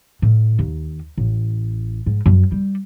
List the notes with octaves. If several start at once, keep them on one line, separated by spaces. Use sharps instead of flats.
A2
D#2
A1
G#2
F#2
G3